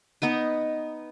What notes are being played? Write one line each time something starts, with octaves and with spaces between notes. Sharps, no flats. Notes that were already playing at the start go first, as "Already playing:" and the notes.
B3 D#4 B4